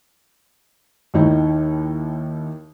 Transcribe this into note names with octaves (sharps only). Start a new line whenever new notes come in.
D#2 D#3 D#4 E4